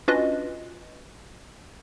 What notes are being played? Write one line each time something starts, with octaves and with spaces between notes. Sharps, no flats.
C#4 D4 F4 F#4 B4 D#5